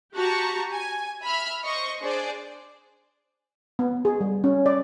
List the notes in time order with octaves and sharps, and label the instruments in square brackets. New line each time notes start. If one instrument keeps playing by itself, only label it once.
[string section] F#4 G4 A5 A#5 C#6
G#5
E5 B5 F6
C5 D#5 C#6
D4 G#4 C5 D5
[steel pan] B3
G#4
G3
C#4
D5